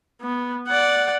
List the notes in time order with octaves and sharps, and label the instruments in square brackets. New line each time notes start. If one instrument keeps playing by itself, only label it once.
[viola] B3
D5 F#5